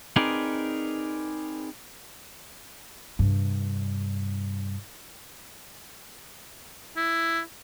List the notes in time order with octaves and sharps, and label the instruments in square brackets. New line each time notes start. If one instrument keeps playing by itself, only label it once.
[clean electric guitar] C4 D#4 G#4 A#4 B4 D5
[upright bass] G2 C3
[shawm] E4